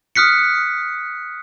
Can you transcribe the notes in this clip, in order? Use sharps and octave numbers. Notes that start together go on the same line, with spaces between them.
D#6 F6 F#6 B6 C#7